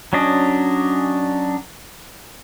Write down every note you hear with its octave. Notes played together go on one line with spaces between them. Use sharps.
F#3 C#4 D4 D#5